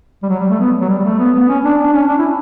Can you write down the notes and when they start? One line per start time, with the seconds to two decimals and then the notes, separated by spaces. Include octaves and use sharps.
0.23 G3
0.29 F#3
0.40 G3
0.50 A3
0.59 B3
0.81 F#3
0.89 G3
1.00 G3
1.04 A3
1.19 B3
1.35 B3
1.49 C#4
1.64 D4
1.78 D4
1.93 C#4
2.08 D4
2.19 E4